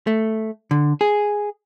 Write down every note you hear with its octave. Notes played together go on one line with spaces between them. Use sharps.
A3
D3
G#4